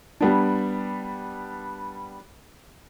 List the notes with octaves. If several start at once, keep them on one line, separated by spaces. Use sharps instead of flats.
G3 B3 D4